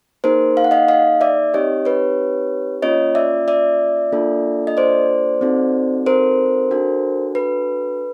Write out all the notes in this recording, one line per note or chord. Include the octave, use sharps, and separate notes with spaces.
A#3 D#4 G#4 A#4 C5
F5
F#5
D#5 F5
D#5 F5
D5 E5
C4 D#4 G4 C#5 D#5
B4 C#5
A#3 C#4 F4 C#5 D#5
D5 E5
D5 E5
A#3 D4 F4 A4
D#5
C5 D5
C4 D#4 F#4 A4
A#4 C5
D4 F#4 A4
B4